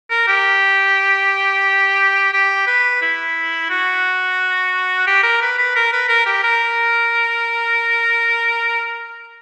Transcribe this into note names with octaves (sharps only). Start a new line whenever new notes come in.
A#4
G4
G4
B4
E4
F#4
G4
A#4
B4
B4
A#4
B4
A#4
G4
A#4